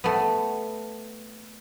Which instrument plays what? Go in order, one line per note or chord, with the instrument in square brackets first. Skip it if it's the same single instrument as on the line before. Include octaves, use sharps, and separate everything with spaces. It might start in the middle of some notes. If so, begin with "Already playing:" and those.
[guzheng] A3 B3